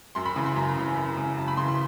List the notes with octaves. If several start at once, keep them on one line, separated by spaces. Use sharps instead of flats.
F#2 C6
B5
C#3 E3
C6
F#2 A#5
C#3 E3
F#2
C#3 E3
F#2 A5
B5
C#3 E3 C6
C6